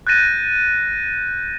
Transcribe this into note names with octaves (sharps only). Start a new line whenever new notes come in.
F#6 G6 A6 A#6 D#7